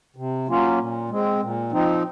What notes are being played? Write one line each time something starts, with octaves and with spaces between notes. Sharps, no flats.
C3
F#3 A#3 C#4 F4
A#2
G#3 C4
A#2
F3 C4 D#4